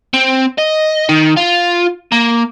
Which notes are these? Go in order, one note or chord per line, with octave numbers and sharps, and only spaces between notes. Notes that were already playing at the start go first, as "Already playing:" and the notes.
C4
D#5
D#3
F4
A#3